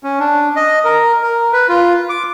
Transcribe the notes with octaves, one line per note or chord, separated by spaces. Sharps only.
C#4
D4
D#5
A#4
A#4
B4
F4
D6